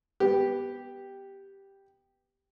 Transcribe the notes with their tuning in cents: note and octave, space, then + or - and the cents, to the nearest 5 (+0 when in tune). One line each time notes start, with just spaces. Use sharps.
B3 +0 G4 +0